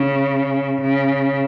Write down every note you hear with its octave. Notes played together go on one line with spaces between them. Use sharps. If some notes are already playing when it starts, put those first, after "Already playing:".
Already playing: C#3
C#3